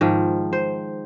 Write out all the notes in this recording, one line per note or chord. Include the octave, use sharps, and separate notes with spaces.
G#2 D#3 F3
C5